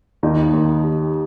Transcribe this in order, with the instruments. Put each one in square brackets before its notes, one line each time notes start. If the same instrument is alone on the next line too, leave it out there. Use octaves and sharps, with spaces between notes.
[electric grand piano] D#2 [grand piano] D#4
[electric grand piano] D#2
G4